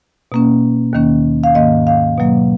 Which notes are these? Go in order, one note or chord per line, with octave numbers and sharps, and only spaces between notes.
B2 A#3 C#4
D#2 D#3 A#3 C#4
F5
G#2 D#3 A#3 D#5
F5
B2 F#3 A#3